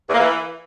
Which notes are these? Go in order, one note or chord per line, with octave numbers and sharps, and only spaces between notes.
E2
A#3
E3